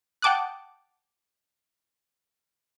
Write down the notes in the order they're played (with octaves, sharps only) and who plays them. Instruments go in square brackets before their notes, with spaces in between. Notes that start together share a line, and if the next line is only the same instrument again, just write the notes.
[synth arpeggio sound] F#5 G5 A5 D6 D#6 F#6